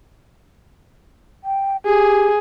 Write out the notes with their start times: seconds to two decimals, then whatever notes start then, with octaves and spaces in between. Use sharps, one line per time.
1.44 G5
1.86 G4 G#4